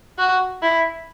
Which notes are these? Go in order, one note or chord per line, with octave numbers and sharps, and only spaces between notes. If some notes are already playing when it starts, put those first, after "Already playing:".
F#4
E4